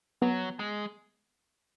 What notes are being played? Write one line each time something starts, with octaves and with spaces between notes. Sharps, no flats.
F#3 B3
G#3